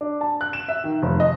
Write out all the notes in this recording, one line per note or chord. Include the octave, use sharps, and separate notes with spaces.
D4
A5
F#6
E7
E5
D#3
F1
D#5